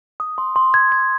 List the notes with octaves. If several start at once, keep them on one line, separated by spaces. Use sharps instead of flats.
D#6
C6
C6
G#6
G#6